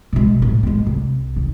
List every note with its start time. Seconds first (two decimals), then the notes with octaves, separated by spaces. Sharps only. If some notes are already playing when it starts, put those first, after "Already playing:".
0.13 B2 G#3
0.40 D2 A2
0.63 G#3 C4
0.87 C2
1.36 D#3